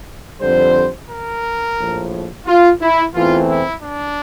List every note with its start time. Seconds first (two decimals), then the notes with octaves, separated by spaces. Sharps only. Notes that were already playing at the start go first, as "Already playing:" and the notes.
0.41 F2 D3 G3 C5
1.09 A#4
1.78 A#1 A2 F3
2.46 F4
2.81 E4
3.14 E2 E3 A3 C4 F4
3.49 E4
3.83 D4